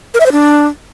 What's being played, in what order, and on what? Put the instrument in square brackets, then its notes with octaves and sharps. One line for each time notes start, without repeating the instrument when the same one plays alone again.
[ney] A#4
E5
C5
D4